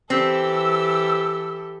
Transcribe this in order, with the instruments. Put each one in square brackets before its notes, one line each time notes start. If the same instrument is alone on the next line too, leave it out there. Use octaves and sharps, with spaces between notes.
[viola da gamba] E3 G4 A4 [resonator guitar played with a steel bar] C4 [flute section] E6